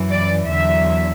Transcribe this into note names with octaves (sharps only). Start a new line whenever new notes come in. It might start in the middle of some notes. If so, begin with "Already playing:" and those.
Already playing: F#2 E3
D5
E2 D3 F#3 E5